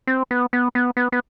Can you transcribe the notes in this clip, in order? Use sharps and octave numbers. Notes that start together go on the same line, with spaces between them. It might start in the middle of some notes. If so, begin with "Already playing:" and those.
C4
B3
B3
B3
B3
B3